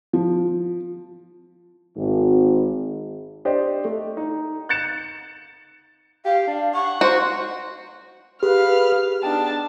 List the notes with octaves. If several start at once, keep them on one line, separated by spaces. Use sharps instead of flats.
F3
G#1
D4 G4 C5 D5 D#5
A3
D#4
F#6 G6 A6 C#7 E7
G4 F5
D4
F#5 C#6
F#4 C5
G4 G#4 B4 F5 F6
B3 D4 D#4 G5 A5